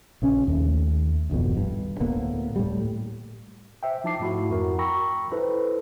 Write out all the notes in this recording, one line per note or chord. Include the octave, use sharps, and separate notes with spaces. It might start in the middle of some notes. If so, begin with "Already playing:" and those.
A#1 C#3 C#4
D#2 A3
D1 G#1 F2 B2
G2
D2 A2 A#3 B3
A2 G3
C5 E5 G5
F3 D#4 E4 A5 D6 C7
G#2 A3 E4 F#4
F2 F#4 A#4
G5 A#5 B5 C#6 E6 A#6
E4 A4 B4 C5